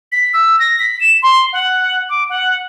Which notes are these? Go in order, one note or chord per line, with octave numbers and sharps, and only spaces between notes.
B6
E6
A#6
B6
E7
C6
F#5
D6
F#5